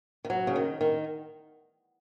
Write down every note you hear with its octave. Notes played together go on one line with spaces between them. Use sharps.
D#3
F#3
C#3
D#3
D#3